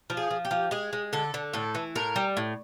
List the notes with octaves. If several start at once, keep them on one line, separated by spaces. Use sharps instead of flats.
F3
G#4
F3
G4
F3
G#3 G#4
G#3
D3 A4
D3
A2 A4
E3
A2 A#4
G3
A2